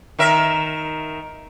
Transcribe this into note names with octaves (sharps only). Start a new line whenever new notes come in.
D#3 A#4 E5